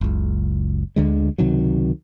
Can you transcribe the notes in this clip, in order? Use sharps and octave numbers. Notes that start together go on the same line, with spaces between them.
F#1 C#2
D2 D3 G#3
C#2 C3 D#3 F#3